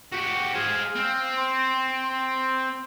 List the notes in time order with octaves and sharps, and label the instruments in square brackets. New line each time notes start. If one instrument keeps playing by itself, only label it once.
[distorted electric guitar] F#4 G4 [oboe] C#6
[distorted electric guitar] G#4 C5 [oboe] F5
[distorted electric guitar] C4
[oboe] C6
C6